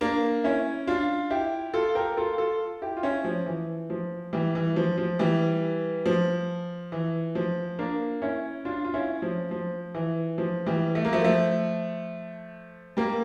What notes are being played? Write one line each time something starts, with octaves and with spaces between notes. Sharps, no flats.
A#3 D4
C#4 E4
D4 F4
E4 G4
F4 A4
G4 A#4
F4 A4
F4 A4
E4 G4
F4
C#4 E4
F3
E3
F3
E3 G3
E3
F3
F3
E3 G3
F3
E3
F3
A#3 D4
C#4 E4
D4 F4
F4
C#4 E4
F3
F3
E3
F3
E3 G3
A3
A#3
F3 A3
F3 A3
G3 A#3